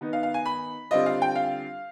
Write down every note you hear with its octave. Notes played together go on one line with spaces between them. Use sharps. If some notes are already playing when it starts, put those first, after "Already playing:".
D#3 B3 D#4
F5
F5
G#5
B5
D3 G3 C4 F4 D#5
F5
G5
F5